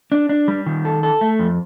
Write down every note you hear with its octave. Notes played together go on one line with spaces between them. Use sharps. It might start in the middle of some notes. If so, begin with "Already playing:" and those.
D4
D4
G3
D#3
A4
A4
A3
F2